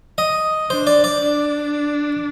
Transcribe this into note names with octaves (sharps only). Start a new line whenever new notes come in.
D#5
D4 C5
D5
D5
D4